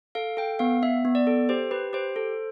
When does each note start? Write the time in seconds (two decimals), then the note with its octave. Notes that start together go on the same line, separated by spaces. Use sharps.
0.15 A4 F5
0.37 A4 G5
0.59 B3 F5
0.82 B3 E5
1.05 B3
1.15 D5
1.27 A4
1.49 G4 C5
1.71 G4 B4
1.93 G4 C5
2.16 A4